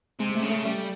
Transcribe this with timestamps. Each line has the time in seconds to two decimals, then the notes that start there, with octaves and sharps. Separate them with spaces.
0.19 C3 G#3
0.30 G#3
0.35 A3
0.42 C#3
0.50 A3
0.64 G3 A3